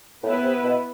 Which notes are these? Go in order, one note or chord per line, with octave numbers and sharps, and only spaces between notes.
A2 B3 E4 B4
C3
B2